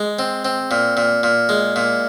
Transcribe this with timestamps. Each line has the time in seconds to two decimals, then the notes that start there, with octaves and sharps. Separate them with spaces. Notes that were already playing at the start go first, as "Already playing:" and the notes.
Already playing: G#3
0.19 C4
0.45 C4
0.71 A#2
0.97 A#2
1.23 A#2
1.49 G#3
1.76 A#2